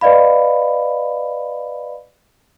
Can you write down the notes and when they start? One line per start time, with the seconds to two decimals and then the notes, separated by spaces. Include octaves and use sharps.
0.01 B4 D5 D#5 F5 B5